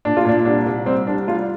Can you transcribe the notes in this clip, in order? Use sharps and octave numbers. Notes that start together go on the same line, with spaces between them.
A#2 D4
F4
A#2 D4
C2 D4
C2
G3 C4
C2 D4
G3 F4